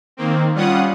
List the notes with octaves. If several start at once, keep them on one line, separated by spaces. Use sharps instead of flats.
D#3 A#3 C4
G3 C#4 F4 F#5 D#6